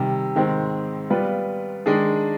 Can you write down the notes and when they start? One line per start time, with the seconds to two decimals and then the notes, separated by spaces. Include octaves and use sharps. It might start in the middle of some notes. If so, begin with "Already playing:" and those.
Already playing: C3 D#3 G3
0.35 G#2 D#3 G#3 C4
1.10 G3 B3 F4 B4 D5
1.86 D#3 G#3 D4 G#4